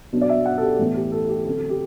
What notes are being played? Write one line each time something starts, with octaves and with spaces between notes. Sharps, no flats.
B2 F#3 B3 D4
D5
E5
F#5
A4
G4
A2 E3 B3 E4
G4
A4
G4
D3 F#3 C4 A4
G4